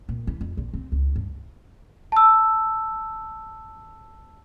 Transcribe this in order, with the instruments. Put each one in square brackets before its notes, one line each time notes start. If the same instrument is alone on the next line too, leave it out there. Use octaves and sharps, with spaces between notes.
[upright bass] A#2
E3
F2
A#1
C4
C#2
G2
[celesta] A5 E6